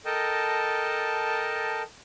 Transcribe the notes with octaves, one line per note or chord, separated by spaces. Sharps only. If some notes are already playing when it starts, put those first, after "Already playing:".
A4 A#4 D#5 G5 A5